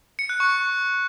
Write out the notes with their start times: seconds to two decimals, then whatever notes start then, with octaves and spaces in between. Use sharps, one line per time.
0.19 C#7
0.29 F#6
0.40 C#6